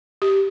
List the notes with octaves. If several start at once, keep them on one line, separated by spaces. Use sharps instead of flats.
G4